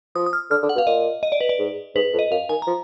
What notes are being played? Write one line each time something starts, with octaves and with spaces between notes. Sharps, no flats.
F3 D#6
D#6
F6
D3 F6
D3
F#5
B2
F5
A#2 D#5
D#5
D5
B4
D5
G#2
G#2 B4
F2
D#5
F#2 F5
D#3 G#5
F3 A#5